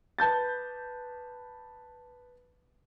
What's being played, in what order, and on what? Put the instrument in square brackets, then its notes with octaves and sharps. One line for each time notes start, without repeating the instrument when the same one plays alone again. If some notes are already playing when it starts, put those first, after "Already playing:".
[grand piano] B4 A5 G6 A6